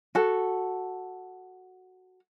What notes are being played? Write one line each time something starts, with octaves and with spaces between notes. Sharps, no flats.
F#4 A4